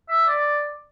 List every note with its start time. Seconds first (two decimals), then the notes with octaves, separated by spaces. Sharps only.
0.08 E5
0.27 D5